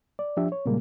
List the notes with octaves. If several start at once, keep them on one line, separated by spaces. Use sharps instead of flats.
D5
F3 D4 G4 E5
C#5
A#2 C#3 G3 G#3 A#3